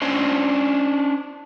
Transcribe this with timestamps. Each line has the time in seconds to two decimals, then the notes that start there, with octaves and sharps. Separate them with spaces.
0.02 C#4 D4 C5